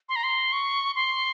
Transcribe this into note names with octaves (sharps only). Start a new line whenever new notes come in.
C6
A#5
C6
C#6
C6